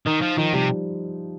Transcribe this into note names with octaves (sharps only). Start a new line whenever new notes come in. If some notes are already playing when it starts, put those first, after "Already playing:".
D#3 D#4
F3
D#3 F3
C3 G3